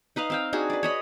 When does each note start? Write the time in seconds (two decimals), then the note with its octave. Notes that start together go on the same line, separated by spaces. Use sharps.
0.16 D#4 B4 D#5 F5
0.30 C4 F5 G5
0.53 D4 D#4 F#4 G#4
0.70 B4 D5
0.83 C#5 D#5 B5